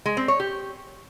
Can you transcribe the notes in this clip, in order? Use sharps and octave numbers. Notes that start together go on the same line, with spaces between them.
G#3
C4
C#5
G4